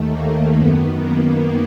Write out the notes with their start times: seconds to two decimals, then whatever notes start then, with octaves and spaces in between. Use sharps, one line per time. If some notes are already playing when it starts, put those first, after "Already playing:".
Already playing: D#2 D#3 A3
0.11 A#3
0.56 F#2 D#3 B3
1.02 A#3